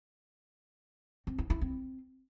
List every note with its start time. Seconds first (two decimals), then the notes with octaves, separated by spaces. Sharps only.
1.27 C4
1.38 E4
1.50 E4
1.61 C4